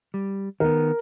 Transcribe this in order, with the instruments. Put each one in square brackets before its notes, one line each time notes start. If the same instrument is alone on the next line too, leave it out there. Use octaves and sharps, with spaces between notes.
[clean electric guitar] G3
[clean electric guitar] D#3 B3 [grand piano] A#4